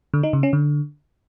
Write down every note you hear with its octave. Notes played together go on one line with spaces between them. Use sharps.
D3
D#4
C#3
C#4
D3